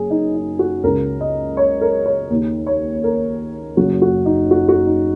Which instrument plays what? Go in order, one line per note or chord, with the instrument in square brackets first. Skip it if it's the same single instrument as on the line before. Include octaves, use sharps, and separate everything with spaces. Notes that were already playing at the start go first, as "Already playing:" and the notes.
Already playing: [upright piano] F#1 F#2 G#4
D#4
D#4
F#4
C#2 C#3 A#4
D#5
C#5
A#4
C#5
D#2 D#3
C#5
A#4
F#1 F#2 C#3 F#4
F#4
D#4
F#4
F#4
D#4